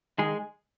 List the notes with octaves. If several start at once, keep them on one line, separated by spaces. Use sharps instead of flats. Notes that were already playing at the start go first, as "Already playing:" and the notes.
D#3 G#3 G#4